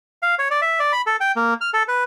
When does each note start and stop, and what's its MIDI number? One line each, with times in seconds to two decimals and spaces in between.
0.22 0.35 77
0.39 0.48 73
0.51 0.61 74
0.62 0.79 76
0.80 0.92 74
0.92 1.01 83
1.06 1.16 69
1.20 1.32 79
1.36 1.54 58
1.61 1.70 89
1.74 1.83 69
1.88 2.04 71